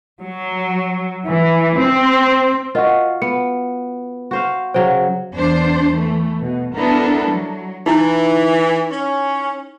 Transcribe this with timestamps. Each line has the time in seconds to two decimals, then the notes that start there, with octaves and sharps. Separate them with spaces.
0.20 F#3
1.28 E3
1.78 C4
2.75 F4 F#4 A#4 D#5 F#5
3.22 B3 C#7
4.31 F#4 C5 F5
4.74 C#3 F#3 C5 G5
5.35 E2 D4 C5
5.91 E3 A3
6.42 B2
6.77 B3 D4 E4 A4 A#4
7.31 F#3
7.86 E3 D#4 E4
8.91 C#4